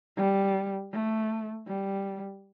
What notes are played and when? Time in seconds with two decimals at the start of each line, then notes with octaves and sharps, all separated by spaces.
0.17 G3
0.92 A3
1.67 G3